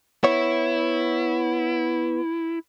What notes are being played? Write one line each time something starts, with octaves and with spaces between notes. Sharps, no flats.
B3 E4 C#5